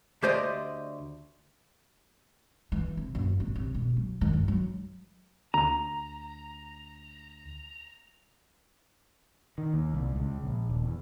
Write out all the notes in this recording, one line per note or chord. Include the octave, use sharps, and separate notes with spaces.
D2 G4 C5 D5 D#5
E3
C3
F#1
G#1
C2
B2
F#3
D#3
G2
F#3
D2 A#5
D#3
D#2
C2
C#2
A#1
D#1
E2